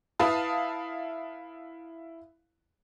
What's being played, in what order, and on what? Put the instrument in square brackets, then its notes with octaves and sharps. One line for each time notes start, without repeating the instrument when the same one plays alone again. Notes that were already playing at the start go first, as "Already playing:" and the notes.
[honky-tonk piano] E4 B4 F5 A5 D#6